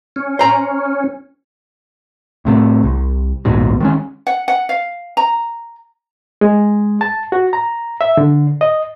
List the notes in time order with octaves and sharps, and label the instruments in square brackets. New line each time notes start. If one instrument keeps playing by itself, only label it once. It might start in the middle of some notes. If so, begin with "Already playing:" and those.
[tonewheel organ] C#4
[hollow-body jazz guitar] C5 A#5
[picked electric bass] A2 C3 A3
C2
A#1 D#2 G#2 B2
D#3 G#3 C#4
[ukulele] F#5
F#5
F5
A#5
[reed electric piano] G#3
A5
F#4
A#5
E5
D3
D#5